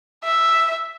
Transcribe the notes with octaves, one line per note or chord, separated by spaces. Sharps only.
E5